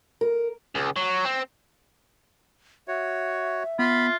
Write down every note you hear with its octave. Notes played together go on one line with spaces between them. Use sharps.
A#4
C#2
F#3
C4
F#4 C#5 E5
B3 F4 B5